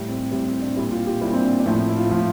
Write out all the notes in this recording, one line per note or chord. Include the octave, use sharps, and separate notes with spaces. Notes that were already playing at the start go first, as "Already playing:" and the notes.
Already playing: A2 G3
C4
A2 G3 C4
C4
D4
A#2 G3 E4
F4
G4
A#2 G3 E4
C4
D4
D4
A2 F3 C4
E4
F4
A2 F3 F4